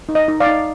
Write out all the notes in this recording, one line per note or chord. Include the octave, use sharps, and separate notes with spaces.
D#4
D#5
D#4
D5 F5
D#4